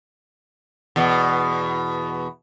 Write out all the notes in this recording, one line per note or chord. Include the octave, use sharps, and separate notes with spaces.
E2 B2